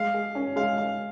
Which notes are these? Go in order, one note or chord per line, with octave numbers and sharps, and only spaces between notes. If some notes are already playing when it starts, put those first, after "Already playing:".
Already playing: G#3 F5
G#4
C#4
G#3 F5
G#3 F5